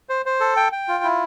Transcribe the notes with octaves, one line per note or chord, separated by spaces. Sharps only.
C5
C5
A4
G5
G5
F4
E4